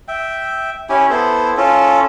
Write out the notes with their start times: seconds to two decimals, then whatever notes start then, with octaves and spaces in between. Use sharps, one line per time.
0.08 E5 G5
0.89 C#4 E4 G4 G#5
1.10 B3 E4 A4 C5
1.57 C#4 F4 A4